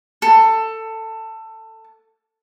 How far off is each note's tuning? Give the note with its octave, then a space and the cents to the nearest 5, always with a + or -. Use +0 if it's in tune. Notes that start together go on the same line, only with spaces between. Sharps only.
A4 +15